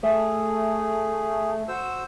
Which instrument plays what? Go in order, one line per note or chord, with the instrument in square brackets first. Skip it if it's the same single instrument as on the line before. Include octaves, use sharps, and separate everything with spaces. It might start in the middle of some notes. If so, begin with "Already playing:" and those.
[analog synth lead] A3 [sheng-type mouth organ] G#4
[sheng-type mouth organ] F#4 C5 E6